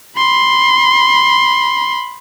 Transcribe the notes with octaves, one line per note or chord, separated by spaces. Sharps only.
B5 C6